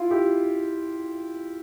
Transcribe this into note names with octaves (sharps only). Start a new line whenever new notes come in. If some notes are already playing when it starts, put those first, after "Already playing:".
Already playing: E4 F4
E4 G4